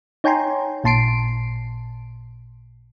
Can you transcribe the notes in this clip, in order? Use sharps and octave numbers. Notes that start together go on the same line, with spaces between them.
D#4 C#5 G5 G#5 A#5 C6
A1 A#2 A5 C6 C7 D7